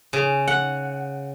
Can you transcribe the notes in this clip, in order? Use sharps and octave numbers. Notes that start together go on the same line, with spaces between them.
C#3
F#5